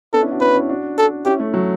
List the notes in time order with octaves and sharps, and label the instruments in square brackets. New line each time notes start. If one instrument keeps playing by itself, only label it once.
[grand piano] B3 D4 [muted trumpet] A4
[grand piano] C#4 E4
D4 F#4
[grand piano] C#4 E4 [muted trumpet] B4
[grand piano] C#4 E4
D4 F#4
[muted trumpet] A4
[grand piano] C#4 E4 [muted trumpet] G4
[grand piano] A3 C#4
F#3 A3